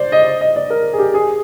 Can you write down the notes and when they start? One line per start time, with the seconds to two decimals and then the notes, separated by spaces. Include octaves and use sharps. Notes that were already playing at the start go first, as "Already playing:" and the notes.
Already playing: C5 D5
0.12 D#5
0.41 D#5
0.56 D5
0.70 A#4
0.93 G#4
0.99 G4
1.14 G#4